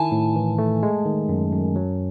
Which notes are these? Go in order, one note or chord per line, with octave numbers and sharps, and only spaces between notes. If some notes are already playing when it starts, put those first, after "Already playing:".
Already playing: D#3 E4 G#5 A5
A2
E3
A3
G#3
D#3
F#2
F#2
F#3